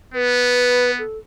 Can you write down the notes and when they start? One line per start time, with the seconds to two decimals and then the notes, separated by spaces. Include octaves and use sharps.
0.14 B3 B4
0.99 A4